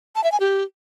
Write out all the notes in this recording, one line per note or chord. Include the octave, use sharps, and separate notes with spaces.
A5
E5
G#5
G4